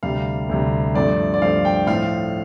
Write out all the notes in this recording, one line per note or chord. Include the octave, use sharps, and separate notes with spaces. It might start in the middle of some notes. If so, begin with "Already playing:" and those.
D2 C3 G3 F5
D2 C3 G3
G2 F3 A3 C4 D5
D5
G2 F3 A3 C4 F5
G5
A2 F3 C4 F5